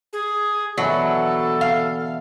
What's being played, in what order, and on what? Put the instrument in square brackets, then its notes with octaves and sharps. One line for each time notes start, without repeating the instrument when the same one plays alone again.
[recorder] G#4
[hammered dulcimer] B2 D3 E3 [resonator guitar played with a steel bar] F#3 [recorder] A4
[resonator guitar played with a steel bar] F5